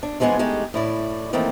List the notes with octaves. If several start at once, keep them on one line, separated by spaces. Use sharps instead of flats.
D4
E3 F3 G#3 B3 G#4
G#3 A3 D#4 G4
A2 E4 D5
D#3 E3 A3 A#3 C4